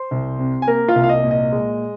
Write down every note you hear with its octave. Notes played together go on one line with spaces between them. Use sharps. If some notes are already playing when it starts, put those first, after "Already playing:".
Already playing: C5 C6
C2
C3
G#5
A#3 A#4 A#5
F4 F5
C2
F5
D#5
A#2
D#5
G#3